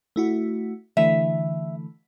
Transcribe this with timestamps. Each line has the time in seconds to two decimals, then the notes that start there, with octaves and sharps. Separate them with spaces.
0.16 A3 E4 F#4
0.97 D3 E3 A3 E5